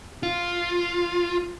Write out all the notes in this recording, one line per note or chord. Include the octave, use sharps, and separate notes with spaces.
F4